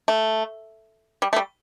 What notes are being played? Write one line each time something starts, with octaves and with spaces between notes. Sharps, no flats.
A3
G3
A3
G3